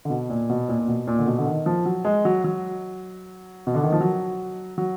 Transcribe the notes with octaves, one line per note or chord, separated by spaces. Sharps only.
D3
B2
A#2
B2
A#2
A#2
B2
A#2
D3
B2
D3
D#3
F3
F#3
G#3
F#3
F#3
B2
D3
D#3
F3
F#3
F#3